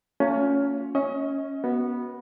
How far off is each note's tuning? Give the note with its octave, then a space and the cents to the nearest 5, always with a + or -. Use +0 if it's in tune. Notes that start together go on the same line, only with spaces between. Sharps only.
A#3 -45 C#4 +20 F4 +35
C#4 +0 D#5 +35
B3 -10 F#4 +15 A#4 +30